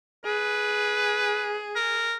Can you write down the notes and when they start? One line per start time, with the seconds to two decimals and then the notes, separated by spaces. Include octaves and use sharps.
0.25 G#4 B4
1.76 A#4